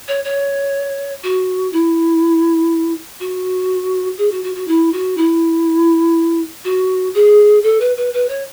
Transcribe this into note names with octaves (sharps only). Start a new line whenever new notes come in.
C#5
C#5
F#4
E4
F#4
G#4
F#4
F#4
F#4
E4
F#4
E4
F#4
G#4
A4
B4
B4
B4
C#5